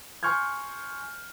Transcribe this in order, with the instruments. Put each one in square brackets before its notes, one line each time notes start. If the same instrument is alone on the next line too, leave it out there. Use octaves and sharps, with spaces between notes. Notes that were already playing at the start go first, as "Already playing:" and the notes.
[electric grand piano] G#5 C6 C#6 F6 G6 G#6